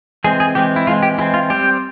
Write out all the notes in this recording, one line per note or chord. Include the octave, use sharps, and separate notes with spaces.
E3 G#3 C4 G#4
G#4
E3 G#3 C4 G4
E4
E3 G#3 C4 F4
G4
E3 G#3 C4 E4
F4
G3 C4 G4